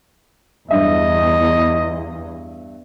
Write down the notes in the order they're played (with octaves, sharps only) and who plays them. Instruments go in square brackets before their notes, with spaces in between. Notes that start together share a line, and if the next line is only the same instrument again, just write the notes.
[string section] E2 [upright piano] G2 E5 [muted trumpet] D#5